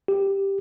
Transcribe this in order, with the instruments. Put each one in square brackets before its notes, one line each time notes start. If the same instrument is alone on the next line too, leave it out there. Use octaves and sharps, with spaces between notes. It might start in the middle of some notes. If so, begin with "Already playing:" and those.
[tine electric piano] G4